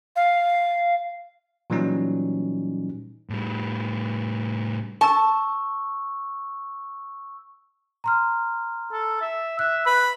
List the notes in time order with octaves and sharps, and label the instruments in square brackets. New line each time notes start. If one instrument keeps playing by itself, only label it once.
[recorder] F5
[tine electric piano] A#2 E3 F#3 G3 C#4 D#4
[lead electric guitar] A2 G3
[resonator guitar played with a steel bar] A5 [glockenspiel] C#6 E6
[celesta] A#5 C6 F6
[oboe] A4
E5
[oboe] E5 [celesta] F#6
[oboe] B4 [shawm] B5